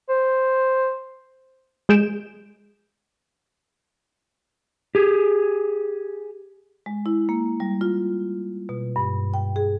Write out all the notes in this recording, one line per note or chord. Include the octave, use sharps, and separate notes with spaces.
C5
G#3 G#4 G6 D7 E7
G4 G#4
G#3
E4
A#3
G3
F4
B2
G2
G5
G#4